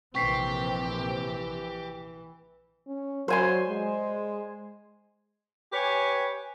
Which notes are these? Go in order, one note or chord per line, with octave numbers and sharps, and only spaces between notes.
A#1 C3 E3 C4 G4 C#6 B6 C7
C#4
F#3 C5 G#5 C6
G#3
G4 B4 C#5 G#5